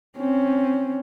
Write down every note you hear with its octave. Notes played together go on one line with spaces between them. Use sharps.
C4 C#4